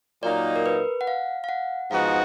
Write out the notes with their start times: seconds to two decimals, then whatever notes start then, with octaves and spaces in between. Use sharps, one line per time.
0.23 A#2 F#3 A#3 D#4 D5
0.56 A#4
0.66 B4
1.01 F#5
1.07 F5
1.44 F5
1.49 F#5
1.91 G#2 F3 B3 D#4 F#4 F5